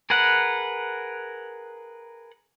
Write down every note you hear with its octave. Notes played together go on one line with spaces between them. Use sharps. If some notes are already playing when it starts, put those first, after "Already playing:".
G#4 A#4 B4 F#5